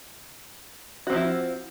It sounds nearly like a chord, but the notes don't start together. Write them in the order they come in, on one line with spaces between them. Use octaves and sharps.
F#4 C4 F3 E4